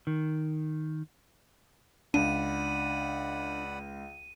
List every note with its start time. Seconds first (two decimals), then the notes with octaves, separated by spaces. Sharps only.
0.07 D#3
2.14 C#2 D4 D5 F#5 B5 D#7